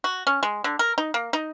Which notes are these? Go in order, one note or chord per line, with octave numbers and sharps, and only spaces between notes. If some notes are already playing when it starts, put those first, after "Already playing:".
F#4
C#4
G#3
D3
A#4
D#4
A#3
D#4